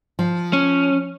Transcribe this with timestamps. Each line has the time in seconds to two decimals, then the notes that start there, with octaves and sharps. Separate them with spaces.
0.19 F3
0.53 C#4